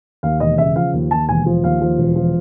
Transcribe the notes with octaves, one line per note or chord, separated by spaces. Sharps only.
D#2 F5
E1 D#5
C#3 E5
F3 F5
D#2
D#2 A5
E1 G#5
F3
D#2 F5
F3
E1
F3